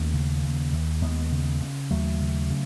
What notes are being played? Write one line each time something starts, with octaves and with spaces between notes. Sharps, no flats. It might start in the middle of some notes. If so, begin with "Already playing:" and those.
Already playing: D#2 A3 C#4
C#3
D#2
D#2
D#2 G#3 B3
C#3
C#3
D#2 F#3 A3
C#3
C#3